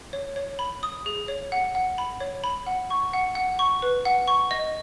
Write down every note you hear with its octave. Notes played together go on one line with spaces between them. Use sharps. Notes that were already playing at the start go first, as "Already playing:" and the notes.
C#5
C#5
B5
D#6
G#4
C#5
F#5
F#5
B5
C#5
B5
F#5
C#6
F#5
F#5
C#6
B4
F#5
C#6
D#5